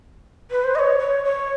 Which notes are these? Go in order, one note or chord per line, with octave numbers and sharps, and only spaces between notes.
B4
C5
D#5
C#5
C#5
C#5